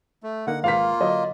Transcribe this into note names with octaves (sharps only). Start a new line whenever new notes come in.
A3
D3 A#3 D#4 F#5
G#1 A#3 F4 B4 F5 B6
D3 F#3 D4 D#5